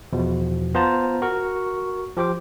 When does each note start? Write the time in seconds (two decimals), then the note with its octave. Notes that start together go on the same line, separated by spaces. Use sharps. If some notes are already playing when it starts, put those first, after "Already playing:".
0.13 E2 B2 F3
0.75 B3 F4 C5 A5 A#5
1.22 F#4 A#4 C#6
2.16 F3 G4 C5 D6